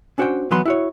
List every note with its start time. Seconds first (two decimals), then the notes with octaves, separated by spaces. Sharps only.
0.18 C#4 D4 F#4 C5 F#5 G5
0.51 E3 F#3 B3 F#4 B5 C6
0.65 E4 F#4 C#5